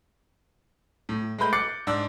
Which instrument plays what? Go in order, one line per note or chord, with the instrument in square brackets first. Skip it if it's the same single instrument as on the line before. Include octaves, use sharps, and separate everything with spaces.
[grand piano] A2
G#3 A3 B4 B5 G6
D6 F#6 A6 C7 C#7
G#2 D4 E6